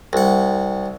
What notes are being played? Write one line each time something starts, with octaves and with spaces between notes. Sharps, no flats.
C2 F#5